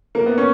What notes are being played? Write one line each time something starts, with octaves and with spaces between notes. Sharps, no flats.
A#3
B3
C#4